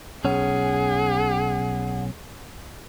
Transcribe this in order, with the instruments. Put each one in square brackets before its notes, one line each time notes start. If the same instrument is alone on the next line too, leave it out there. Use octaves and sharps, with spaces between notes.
[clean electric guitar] B1 C#4 [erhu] G#4 [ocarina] F#5